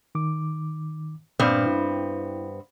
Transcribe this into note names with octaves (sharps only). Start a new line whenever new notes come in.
D#3 D6
G2 A#2 B3 C4 D5 F6
E4